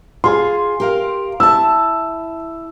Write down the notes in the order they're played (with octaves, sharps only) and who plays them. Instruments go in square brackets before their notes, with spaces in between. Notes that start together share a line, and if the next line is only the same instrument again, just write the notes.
[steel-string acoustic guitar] F4 G#4 [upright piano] C6
[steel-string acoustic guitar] G4 A#4 F5
[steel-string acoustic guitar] E4 A5 [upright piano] E6